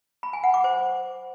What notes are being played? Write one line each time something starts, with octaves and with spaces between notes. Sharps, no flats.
B5
G#5
F#5
D6
C5